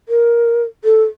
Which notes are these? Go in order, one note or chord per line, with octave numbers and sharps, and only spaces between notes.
A#4
A4